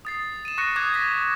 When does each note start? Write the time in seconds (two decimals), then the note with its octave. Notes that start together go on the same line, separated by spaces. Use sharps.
0.05 D#6 A6 C7
0.45 D#7 E7
0.58 C#6 F#6 A#6 C#7 D#7
0.76 D6 D#6 F#6 G#6
0.93 G#6 A#6 B6